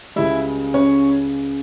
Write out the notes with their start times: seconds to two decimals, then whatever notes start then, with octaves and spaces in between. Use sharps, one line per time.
0.16 C#2 C#3 G3 E4 E5
0.74 C#4 C#5